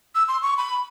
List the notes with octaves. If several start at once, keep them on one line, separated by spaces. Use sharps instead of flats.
E6
C6
C#6
B5